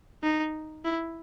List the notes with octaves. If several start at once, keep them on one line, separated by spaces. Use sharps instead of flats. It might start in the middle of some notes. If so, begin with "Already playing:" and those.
D#4
E4